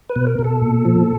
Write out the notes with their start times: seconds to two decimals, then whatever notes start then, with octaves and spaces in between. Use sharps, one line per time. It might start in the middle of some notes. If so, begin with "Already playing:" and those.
0.09 B4
0.16 B2
0.27 A#4
0.39 B2
0.44 A4
0.62 A#2
0.85 F3